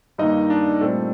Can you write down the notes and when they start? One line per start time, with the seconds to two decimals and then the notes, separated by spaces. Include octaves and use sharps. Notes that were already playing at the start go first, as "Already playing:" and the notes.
0.18 G2 D#3 A#3 D#4 D#5
0.50 D4 D5
0.81 A#2 G3 A3 C4 A4